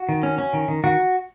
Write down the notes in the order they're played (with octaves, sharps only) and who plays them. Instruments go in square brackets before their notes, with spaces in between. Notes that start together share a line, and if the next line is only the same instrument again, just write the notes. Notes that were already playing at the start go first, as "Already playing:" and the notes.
Already playing: [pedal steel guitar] F#4
D#3
C#4
C#4
D#3
D#3
D#3 F#4